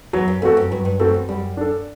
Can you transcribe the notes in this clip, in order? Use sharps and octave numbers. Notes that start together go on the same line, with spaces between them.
E2 F#3
F#2
E2 A3 C4 F#4 A4
F#2
G2 F#3
G2
F#2 A3 C4 F#4 A4
E2
F#2 G3
D4 A4